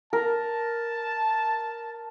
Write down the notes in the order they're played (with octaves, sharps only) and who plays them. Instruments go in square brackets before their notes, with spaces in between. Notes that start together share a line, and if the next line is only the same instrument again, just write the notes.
[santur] A#4 [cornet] A5